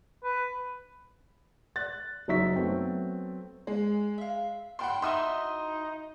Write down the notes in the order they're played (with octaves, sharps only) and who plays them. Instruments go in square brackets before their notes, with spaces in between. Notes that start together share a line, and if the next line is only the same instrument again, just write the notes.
[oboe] B4
[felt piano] F#6 A6
F#1 F#3 D#4 E5 C#6 B6
F#3 A3 B3 C4
[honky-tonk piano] G#3
[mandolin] E5 F5
[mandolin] D4 B5 F6 [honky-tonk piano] F#5 G5 C6
[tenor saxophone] D#4 [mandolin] E4 F#4 E5 [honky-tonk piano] C6 D#6